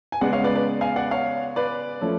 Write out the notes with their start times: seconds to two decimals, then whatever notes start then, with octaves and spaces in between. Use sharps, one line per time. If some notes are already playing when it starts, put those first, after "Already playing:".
0.12 G#5
0.21 C#3 G#3 B3 D5 F#5
0.33 C#5 F5
0.44 B4 D5
0.55 B4 D5
0.81 F5 G#5
0.96 D5 F#5
1.11 C#5 F5
1.56 B4 D5
2.01 F3 A3 C#4